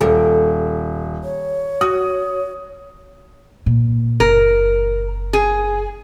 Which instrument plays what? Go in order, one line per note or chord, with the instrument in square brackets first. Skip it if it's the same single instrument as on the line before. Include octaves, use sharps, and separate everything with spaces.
[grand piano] D#1 [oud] A4 A#4
[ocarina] C#5
[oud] F#4 [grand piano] D#6
[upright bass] A#2
[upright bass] F#1 [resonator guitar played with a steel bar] A#4
[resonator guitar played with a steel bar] G#4